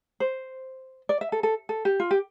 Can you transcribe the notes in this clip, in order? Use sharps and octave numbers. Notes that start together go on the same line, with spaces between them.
C5
D5
E5
A4
A4
A4
G4
F4
G4